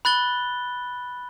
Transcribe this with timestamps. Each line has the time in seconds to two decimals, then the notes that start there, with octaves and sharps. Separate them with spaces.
0.05 B5 F#6 A6 G7